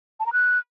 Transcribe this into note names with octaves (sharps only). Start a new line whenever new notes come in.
A5
A#5
F#6